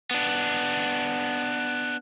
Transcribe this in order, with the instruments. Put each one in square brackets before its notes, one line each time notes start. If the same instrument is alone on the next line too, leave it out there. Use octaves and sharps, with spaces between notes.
[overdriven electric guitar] B3 D4